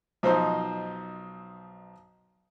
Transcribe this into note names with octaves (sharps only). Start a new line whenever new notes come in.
B1 F3 D#4 C5 A#5